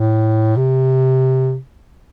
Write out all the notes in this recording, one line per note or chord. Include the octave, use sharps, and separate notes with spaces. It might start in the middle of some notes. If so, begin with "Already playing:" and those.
Already playing: A2
C3